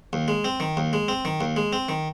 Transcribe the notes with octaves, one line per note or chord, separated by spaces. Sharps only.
D#2
G#3
C4
D#3
D#2
G#3
C4
D#3
D#2
G#3
C4
D#3